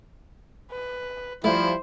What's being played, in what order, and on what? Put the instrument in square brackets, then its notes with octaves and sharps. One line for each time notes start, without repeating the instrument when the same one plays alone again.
[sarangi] B4
[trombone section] F3 G3 [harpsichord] A3 [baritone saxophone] E4 [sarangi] C5